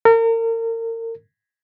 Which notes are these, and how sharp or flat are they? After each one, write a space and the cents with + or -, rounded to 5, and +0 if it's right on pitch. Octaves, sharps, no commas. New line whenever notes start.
A#4 -35